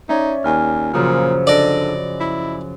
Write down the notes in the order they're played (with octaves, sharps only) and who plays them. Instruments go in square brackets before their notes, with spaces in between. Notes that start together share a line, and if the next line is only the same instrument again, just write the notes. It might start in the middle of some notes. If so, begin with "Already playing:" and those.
[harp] C#4 [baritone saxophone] D#4 [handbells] C#5 D5 E5
[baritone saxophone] D#2 [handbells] D5 G#5 F6
[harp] F#2 C#3 F3 [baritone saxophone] A#2 [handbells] A#5 D#6 F6
[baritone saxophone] D3 [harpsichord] D5 [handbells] D#5 A#6 D7
[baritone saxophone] E4